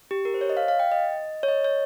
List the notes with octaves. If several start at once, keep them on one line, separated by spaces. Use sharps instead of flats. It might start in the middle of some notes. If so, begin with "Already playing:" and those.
G4
A#4
C5
C#5
D#5
F5
F5
G5
D#5
C#5
D#5
C#5